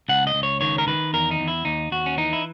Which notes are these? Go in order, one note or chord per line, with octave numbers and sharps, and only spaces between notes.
C#2 F#5
D#5
C#2
C#5
D#3 C#5
A#4
D#3 B4
E2 A#4
D#4
E2
E4
D#2 D#4
D#2 F#4
C#4
E3 D#4
E4